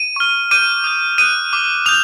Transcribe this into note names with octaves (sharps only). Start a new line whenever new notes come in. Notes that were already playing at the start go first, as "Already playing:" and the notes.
Already playing: D#7
C#6 F6
D6 G6 D#7
D#6 G6
D#6 F#6 D#7
D6 F6
D#6 G6 F7